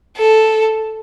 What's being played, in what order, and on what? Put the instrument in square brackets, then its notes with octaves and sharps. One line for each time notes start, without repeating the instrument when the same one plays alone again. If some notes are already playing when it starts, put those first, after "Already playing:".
[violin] A4